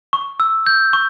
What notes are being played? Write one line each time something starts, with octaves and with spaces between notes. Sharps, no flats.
C#6
E6
G6
C#6